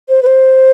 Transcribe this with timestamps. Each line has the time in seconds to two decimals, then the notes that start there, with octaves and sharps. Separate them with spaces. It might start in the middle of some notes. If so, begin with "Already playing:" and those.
0.09 C5
0.22 B4
0.26 C5